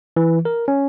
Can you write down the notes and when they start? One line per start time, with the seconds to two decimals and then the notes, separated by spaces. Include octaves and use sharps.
0.16 E3
0.45 A#4
0.68 C#4